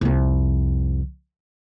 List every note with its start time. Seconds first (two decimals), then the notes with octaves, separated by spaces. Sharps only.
0.01 C2 F2